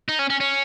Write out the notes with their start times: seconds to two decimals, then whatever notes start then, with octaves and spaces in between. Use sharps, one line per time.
0.09 D#4
0.19 C#4
0.30 C#4
0.40 C#4